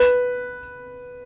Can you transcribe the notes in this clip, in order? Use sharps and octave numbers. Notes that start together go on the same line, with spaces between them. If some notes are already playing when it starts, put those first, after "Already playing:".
Already playing: B4